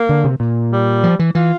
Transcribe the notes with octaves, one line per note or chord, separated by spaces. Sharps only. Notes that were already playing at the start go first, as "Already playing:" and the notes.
Already playing: A#3
D3
C3
A#2
G3
F3
E3
E3 F4